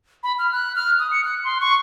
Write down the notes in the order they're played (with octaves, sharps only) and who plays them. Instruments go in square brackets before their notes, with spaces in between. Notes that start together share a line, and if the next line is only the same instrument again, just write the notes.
[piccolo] B5
F6
F#6
F6
D#6
C#7
F#6
C6
C#6